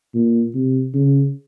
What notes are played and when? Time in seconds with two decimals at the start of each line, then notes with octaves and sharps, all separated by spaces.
0.15 A#2
0.54 C3
0.94 C#3